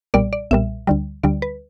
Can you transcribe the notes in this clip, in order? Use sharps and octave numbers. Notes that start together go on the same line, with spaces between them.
B1 A#2 G3 D5
D5
B1 A#2 G3 E5
D2 D3 G3
D2 D3 G3 D5
B4